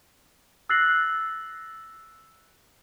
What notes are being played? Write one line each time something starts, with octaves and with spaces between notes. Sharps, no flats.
E6 F#6 A6 A#6 C7 F#7